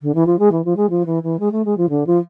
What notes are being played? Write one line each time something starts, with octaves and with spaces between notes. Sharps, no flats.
D3
E3
F3
G#3
E3
F3
G#3
F3
E3
E3
G#3
A3
G#3
F3
D3
F3